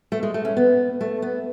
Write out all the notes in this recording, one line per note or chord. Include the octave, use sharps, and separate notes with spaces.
A3
G#3
A3
C#4
B3
A3
B3